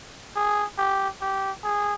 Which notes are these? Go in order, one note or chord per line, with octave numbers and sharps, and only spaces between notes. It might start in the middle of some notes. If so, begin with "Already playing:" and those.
G#4
G4
G4
G#4